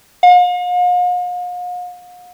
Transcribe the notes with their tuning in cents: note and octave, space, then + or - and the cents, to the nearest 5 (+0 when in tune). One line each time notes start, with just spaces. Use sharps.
F5 +45